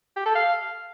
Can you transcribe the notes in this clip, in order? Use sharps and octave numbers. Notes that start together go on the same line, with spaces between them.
G4
A4
F5